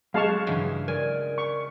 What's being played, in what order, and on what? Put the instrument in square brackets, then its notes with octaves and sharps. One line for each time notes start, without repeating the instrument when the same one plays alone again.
[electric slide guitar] F#3 [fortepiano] G#3 [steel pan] F5 A5 C#6
[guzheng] G2 C#3 E3
[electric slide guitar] A#4 D5 [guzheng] G#5
[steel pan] C#6